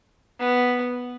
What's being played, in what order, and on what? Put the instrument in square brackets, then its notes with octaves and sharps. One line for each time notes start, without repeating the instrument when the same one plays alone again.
[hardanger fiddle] B3